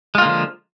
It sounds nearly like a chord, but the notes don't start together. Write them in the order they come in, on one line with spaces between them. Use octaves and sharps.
G#3 F4 A#3 D3 F3